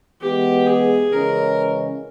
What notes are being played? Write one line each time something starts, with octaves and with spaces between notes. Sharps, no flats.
E3 G#3 B3 G4
G#4
C#3 E3 G#3 C#4 A#4